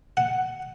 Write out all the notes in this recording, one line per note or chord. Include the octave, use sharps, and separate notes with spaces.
F#5